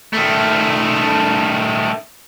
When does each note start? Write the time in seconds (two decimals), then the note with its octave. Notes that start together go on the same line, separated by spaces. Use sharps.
0.13 D#3 A3